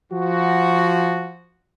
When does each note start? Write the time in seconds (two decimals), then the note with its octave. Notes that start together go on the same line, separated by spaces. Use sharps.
0.12 F3 F#4